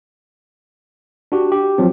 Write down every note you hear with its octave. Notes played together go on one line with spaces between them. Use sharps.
D4 F#4 G4
G4
F3 F#3 C4